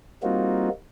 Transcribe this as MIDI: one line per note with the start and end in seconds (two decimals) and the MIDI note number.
0.23 0.69 55
0.23 0.69 58
0.23 0.69 60
0.23 0.69 63
0.23 0.69 65
0.23 0.69 66